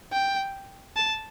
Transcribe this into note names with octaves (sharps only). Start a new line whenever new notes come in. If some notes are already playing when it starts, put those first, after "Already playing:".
G5
A5